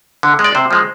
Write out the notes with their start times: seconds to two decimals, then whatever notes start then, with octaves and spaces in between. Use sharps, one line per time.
0.23 D3
0.39 G#3
0.44 D5
0.55 C3 C5
0.71 F3 G#3